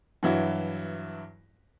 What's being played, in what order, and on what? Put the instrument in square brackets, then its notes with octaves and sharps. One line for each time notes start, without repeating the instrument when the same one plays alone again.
[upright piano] G2 E3 F#3 E4 F#4